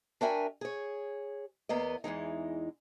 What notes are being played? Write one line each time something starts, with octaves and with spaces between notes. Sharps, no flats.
D4 F#4 A#4 E5 G5 G#5
G#4 C#5
E2 A#3 B3 D#5
E2 E3 G#3 D#4